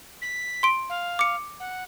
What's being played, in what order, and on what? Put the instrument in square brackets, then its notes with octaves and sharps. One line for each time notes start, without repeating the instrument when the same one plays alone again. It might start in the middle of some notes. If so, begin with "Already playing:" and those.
[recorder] B6
[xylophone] C6 D7
[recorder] F5
[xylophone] D6 C#7
[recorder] F#5